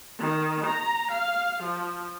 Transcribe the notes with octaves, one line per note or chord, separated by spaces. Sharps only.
D#3
A#5
F5
F3